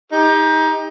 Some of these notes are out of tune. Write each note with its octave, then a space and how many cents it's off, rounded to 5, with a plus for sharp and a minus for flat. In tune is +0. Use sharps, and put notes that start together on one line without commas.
D#4 +25 G4 +40